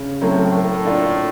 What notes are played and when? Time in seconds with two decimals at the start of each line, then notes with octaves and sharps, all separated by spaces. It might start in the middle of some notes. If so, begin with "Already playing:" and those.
Already playing: C#3
0.21 A2 F#3 A3 C4
0.54 A#3
0.85 D4 F4 A4